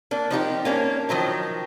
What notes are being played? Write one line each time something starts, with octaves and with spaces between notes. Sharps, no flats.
A#3 D4
F3 D#4 F#4 G4
A#3 C#4 D4
D#3 F3 F#3 D#4